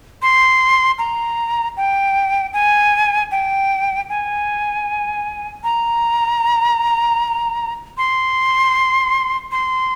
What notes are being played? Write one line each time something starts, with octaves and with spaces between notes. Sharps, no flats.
C6
A#5
G5
G#5
G5
G#5
A#5
C6
C6